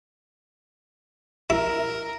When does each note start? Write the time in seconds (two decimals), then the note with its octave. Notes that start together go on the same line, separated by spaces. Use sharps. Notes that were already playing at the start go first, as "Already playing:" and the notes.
1.50 E4 A#4